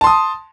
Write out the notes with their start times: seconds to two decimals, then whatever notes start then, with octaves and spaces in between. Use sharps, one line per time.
0.01 A5
0.04 C6
0.07 D#6